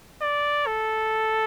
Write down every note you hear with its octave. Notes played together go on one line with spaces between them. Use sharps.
D5
A4